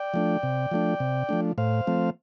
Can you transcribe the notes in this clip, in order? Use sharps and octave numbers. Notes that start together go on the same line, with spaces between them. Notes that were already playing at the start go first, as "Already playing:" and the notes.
Already playing: D5 G5
F3 A3 D4
C3
F3 A3 D4
C3
F3 A3 D4
A2 C5 F5
F3 A3 C4